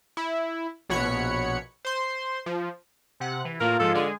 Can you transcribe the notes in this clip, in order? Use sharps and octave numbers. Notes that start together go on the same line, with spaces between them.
E4
A#1 B2 C#5 F#5 B5 C#7
C5 C6
F3
C3 F#5
E3
A2 A#3 F4 A#4
G#2 F3 G#3 A4
D3 G#3 G#4